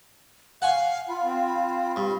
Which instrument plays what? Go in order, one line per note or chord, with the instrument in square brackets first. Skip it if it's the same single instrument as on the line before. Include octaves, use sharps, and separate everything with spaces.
[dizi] F5 [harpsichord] F#5 G#5 C#6
[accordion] F4 [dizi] B5
[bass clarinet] C4
[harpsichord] G2 [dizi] B5